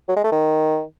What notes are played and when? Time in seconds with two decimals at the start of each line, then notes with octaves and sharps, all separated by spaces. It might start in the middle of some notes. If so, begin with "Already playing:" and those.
0.08 F#3
0.16 G#3
0.24 A3
0.32 D#3